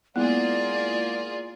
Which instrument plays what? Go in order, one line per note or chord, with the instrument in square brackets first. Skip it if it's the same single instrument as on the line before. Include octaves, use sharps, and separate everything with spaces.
[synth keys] G#3 E4 F#5 [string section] A#3 F4 G#4 [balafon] B3 [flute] D5